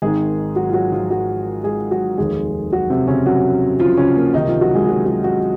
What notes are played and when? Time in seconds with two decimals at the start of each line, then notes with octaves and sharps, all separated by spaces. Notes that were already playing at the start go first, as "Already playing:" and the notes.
0.02 G#1 G#2 D#3 G#3 G#4
0.56 F#3 F#4
0.70 F4
0.73 F#3 F#4
0.92 F3 F4
1.10 F#3 F#4
1.64 G#3 G#4
1.91 F#3 F#4
2.18 F1 D#2 D#3 G#3 G#4
2.72 F#3 F#4
2.90 C3 C4
3.08 C#3 C#4
3.26 F#3 F#4
3.79 F3 F4
3.97 C#3 C#4
4.16 A#3
4.33 C#2 C3 D#3 D#4
4.47 F3 F4
4.61 F#3 F#4
4.75 G#3 G#4
4.88 F#3 F#4
5.06 F#3 F#4
5.24 F#3 F#4